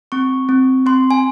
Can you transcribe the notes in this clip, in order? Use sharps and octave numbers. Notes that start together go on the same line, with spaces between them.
C4 C#6
C4
C4 C6
G#5